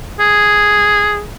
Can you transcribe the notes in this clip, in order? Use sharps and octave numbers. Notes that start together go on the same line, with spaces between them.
G#4